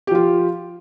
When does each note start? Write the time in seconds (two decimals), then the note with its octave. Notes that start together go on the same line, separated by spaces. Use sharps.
0.07 G4
0.11 F3
0.15 F4